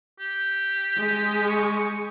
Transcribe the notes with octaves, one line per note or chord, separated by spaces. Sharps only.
G4
G#3
C#6